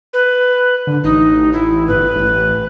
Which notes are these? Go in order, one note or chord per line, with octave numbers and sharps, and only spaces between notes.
B4
D3
A1 D#4
E4
G1 B4
A1